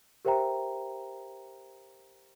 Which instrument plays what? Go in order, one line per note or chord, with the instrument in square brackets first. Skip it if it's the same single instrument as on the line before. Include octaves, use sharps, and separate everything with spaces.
[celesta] G4 A#4 C5 E5 G5 A#5